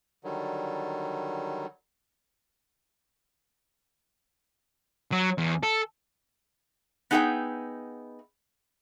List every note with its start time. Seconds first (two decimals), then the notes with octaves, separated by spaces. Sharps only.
0.24 D3 D#3 F#3 G3
5.12 F#3
5.38 E2
5.63 A4
7.11 B3 D#4 G#4 A#4 E5 G5